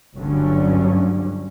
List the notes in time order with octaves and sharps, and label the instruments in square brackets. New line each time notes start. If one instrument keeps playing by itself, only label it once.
[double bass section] G1 D2 G2 D3 F#3 C#4